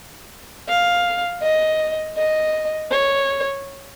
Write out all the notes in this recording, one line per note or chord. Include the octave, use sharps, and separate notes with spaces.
F5
D#5
D#5
C#5